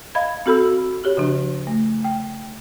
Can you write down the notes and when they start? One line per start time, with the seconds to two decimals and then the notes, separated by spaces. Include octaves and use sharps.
0.15 D#5 F5 B5 G#6
0.46 C4 F#4 A4 B5 E6
1.04 F#4 G4 C#5
1.17 C#3 F3 D4
1.67 A3
2.04 G5